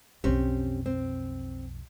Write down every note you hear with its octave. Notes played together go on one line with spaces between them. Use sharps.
B1 F2 C4 C#4 G4
C4